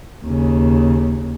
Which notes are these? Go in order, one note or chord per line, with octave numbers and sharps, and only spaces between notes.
D#2 C#3